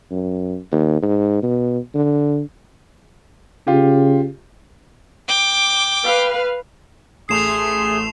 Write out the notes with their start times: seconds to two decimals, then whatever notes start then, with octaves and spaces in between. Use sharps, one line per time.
0.11 F#2
0.72 D#2
1.02 G#2
1.42 B2
1.94 D3
3.67 C#3 F4 G4
5.28 G5 D6
6.05 B4 F5
7.29 A1 A3 G#4 C6 C7 E7 F7